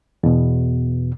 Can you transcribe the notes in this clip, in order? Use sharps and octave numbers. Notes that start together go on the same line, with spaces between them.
E2 B2